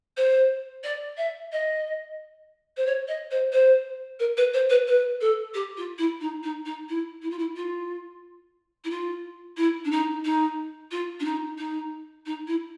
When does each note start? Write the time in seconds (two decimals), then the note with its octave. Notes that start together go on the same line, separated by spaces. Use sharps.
0.17 C5
0.84 D5
1.17 E5
1.52 D#5
2.77 C5
2.86 C#5
3.08 D#5
3.31 C5
3.52 C5
4.19 A#4
4.37 B4
4.54 C5
4.70 B4
4.88 B4
5.21 A4
5.54 G4
5.77 F4
5.98 E4
6.21 D#4
6.43 D#4
6.65 D#4
6.89 E4
7.22 E4
7.30 F4
7.38 E4
7.56 F4
8.84 E4
8.90 F4
9.57 E4
9.85 D4
9.91 D#4
10.25 D#4
10.91 F4
11.20 D4
11.25 D#4
11.58 D#4
12.26 D#4
12.47 E4